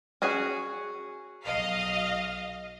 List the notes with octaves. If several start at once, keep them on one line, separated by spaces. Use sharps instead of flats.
C#4 F#4 G#4
B1 D#5 F5